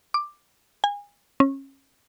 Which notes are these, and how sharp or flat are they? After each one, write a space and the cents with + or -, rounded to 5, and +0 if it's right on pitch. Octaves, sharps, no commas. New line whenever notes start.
D6 +10
G#5 -30
C#4 -25